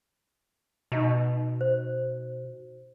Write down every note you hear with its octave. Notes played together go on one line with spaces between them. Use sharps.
B2 D#4 D#5 A#5
C5